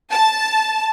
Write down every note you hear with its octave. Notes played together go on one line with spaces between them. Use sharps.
A5